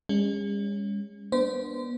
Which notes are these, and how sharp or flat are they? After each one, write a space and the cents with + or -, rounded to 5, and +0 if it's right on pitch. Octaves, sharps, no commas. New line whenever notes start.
G#3 -45 C#4 +0
B3 -30 D4 +0 C5 -30